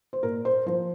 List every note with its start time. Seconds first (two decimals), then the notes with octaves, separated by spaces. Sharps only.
0.13 C5
0.23 A#2 A#4
0.45 C5
0.66 F3 C5